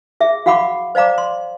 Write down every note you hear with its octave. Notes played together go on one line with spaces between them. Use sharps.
G#4 E5
F#4 F5 F#5 B5 C#6 D6
C5 D5 F5 A#5 D6
C6